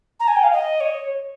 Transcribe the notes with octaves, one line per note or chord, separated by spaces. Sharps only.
A#5
G#5
G5
F5
D#5
C#5